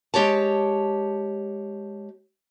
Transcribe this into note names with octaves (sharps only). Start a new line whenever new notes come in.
G#3 G4 C#5 A5